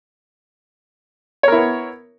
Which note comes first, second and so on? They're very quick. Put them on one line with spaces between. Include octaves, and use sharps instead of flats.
C#5 A#4 E4 B3